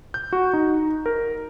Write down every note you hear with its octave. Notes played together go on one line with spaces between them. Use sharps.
G6
F#4
D#4
A#4